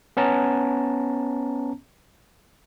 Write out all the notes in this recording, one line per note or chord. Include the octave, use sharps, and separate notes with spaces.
B3 C#4 A5 A#5